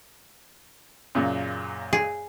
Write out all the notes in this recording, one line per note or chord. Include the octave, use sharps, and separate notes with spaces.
F#2 A#2 C#3
G#4